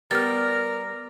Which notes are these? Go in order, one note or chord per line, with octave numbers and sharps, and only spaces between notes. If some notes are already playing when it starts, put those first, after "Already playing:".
G3 B3 A#4 F6 A6